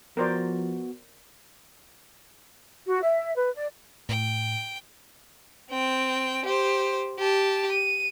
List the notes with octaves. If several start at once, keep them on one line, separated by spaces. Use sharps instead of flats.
F3 B3 F#4 A#4 C5 D5
F#4
E5
B4
D5
A2 G5
C4 G5
G4 C5
G4 A5
D#7